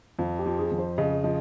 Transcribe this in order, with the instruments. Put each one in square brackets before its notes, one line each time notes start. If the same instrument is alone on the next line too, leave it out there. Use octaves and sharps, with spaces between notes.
[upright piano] F2 [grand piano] F4
[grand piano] G4
[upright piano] F3
[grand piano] G#4
[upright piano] F2
[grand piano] C5
[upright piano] C#3 [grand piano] D#5
[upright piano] F3 [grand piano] D#5